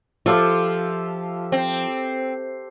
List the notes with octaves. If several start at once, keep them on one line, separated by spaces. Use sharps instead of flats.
F3 F4 G4 A4 E5
C4